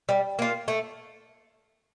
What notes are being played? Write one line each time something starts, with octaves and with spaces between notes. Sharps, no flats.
G3
A#3 F4
A3